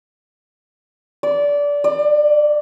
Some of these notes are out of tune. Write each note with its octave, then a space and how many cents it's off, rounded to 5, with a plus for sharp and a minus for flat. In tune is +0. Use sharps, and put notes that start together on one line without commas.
D5 -20
D5 +25